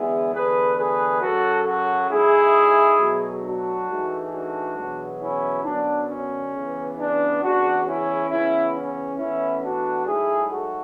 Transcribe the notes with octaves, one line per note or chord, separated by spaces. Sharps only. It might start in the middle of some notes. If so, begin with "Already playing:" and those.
Already playing: E2 D3 G#3 B3 E4 G#4
E2 D3 A3 G#4 B4
G#4 B4
F#2 C#3 F#3 F#4 A4
F#4 A4
G#2 F#3 A3 E4 G#4
B2 F#3 A3
D4 F#4
G#2 E3 A3
D4 F#4
E2 B2 F#3 B3
C#4 E4
F#2 D3 F#3 B3 D4
C#4
C#3 E3 B3
D4
E2 C#3 E3 D4 F#4
C#4 E4
C#3 E3 B3 C#4 E4
C#4
A2 E3 B3 C#4 E4
D4 F#4
G#2 F#3 A3 E4 G#4
F#4 A4